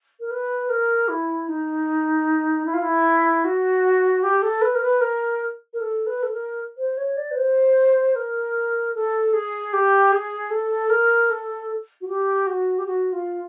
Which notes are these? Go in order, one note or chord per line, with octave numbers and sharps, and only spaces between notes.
A#4
B4
A#4
E4
D#4
E4
F4
E4
F#4
G4
A4
B4
A#4
B4
A#4
A#4
A4
B4
A4
A#4
C5
C#5
D5
B4
C5
A#4
A4
G#4
G4
G#4
A4
A#4
A4
F#4
G4
F#4
G4
F#4
F4